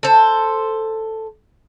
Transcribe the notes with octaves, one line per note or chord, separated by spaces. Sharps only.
A4 C5